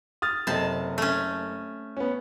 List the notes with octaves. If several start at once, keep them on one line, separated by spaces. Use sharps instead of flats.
D#6 F6 A6
F#1 C3 A4 D#5 A5
A3 C#4
B3 C#4